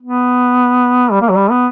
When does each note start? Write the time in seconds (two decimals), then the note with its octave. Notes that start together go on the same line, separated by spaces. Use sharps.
0.02 B3
1.12 G3
1.21 A#3
1.29 F#3
1.36 G3
1.51 B3